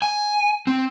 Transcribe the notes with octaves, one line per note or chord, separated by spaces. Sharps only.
G#5
C4